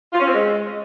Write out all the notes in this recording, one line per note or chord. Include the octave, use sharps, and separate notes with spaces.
F4
C#4
C4
G#3